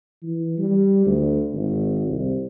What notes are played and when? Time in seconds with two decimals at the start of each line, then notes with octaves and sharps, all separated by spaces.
0.22 E3
0.58 G3
1.06 D2
1.54 G#1
2.07 C2